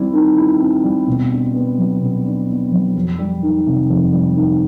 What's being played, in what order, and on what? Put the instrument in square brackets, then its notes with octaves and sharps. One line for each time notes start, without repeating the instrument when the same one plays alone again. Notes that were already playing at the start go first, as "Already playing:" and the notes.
Already playing: [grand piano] G3 C4 E4
D#3
E4
C4
G3
B2
D4
B3
F#3
B2
D4
B3
F#3
F2
G3
D#3
C3
F2
G3
D#3